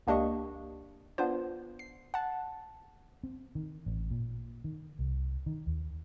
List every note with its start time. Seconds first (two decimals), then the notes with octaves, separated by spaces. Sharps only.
0.07 C#2 A#3 D4 G4 D#5 C#6
1.18 B3 D4 F4 C5
1.79 C7
2.14 F#5 A5
3.23 C4
3.55 D#3
3.86 A1
4.11 A#2
4.64 D#3
4.99 C2
5.46 D#3
5.67 D#2